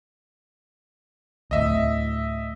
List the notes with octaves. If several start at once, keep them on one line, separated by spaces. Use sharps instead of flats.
D2 A2 D#5 E5